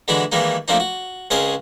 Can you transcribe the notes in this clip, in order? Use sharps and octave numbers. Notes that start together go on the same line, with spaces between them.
D3 E3 G#3 D4 F#4 B5
D#3 E3 G3 G#3 A#3 D#4
F3 A3 A#3 C4 D4 D#4
F#4
C#2 C4 C#4 G#4 A#4 D#5